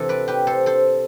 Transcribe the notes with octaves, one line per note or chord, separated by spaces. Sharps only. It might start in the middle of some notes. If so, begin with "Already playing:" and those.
Already playing: C3 E3 A4
B4 D5
G4 B4
A4 C5
A4 C5